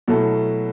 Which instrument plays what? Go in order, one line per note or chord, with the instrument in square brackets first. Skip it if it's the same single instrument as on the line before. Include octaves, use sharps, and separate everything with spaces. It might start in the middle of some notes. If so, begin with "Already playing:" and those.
[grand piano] B2 F#3 A3 E4 A4